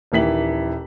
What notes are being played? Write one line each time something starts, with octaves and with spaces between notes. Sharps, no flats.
D#1 D#3 E3 B6 F#7